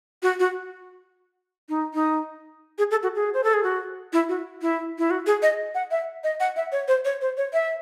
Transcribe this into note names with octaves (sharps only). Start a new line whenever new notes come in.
F#4
F#4
D#4
D#4
G#4
A4
F#4
G#4
C5
A4
G#4
F#4
E4
F#4
E4
E4
F#4
G#4
D#5
F#5
E5
D#5
F#5
E5
C#5
C5
C#5
C5
C#5
E5